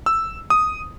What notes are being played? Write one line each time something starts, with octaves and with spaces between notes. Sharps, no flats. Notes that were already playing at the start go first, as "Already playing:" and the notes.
E6
D#6